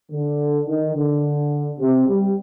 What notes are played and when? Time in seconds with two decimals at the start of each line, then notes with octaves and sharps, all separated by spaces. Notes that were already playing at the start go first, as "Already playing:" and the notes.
0.11 D3
0.67 D#3
0.95 D3
1.79 C3
2.08 G3